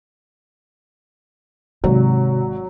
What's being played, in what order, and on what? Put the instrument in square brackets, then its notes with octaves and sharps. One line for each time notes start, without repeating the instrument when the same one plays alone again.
[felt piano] G#1 [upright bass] C3 [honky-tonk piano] F#3